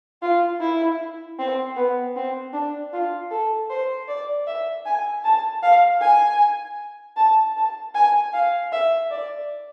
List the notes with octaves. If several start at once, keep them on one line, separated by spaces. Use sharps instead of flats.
F4
E4
C4
B3
C4
D4
F4
A4
C5
D5
E5
G#5
A5
F5
G#5
A5
A5
G#5
F5
E5
D5